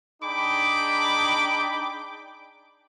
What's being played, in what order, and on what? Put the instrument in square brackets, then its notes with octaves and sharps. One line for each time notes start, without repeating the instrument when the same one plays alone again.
[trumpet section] D4 D#4 G#4 G5 B5 D6